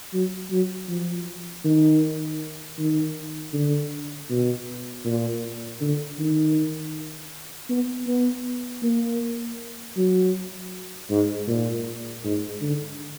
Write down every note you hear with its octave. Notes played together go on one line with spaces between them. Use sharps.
F#3
F#3
F3
D#3
D#3
D3
B2
A#2
D3
D#3
B3
B3
A#3
F#3
G#2
A#2
G#2
D3